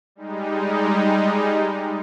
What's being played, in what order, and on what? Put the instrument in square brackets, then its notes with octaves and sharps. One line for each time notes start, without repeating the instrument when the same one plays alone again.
[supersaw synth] G3 G#3 D#4